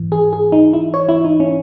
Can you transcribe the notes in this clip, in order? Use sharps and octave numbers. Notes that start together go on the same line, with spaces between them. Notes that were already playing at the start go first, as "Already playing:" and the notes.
Already playing: G#2 E3
G#4
G#4
D#4
E4
C#5
E4
D#4
C#4